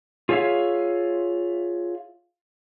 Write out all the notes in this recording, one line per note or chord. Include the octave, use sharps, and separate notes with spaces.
F4 G#4 C#5 E5 F5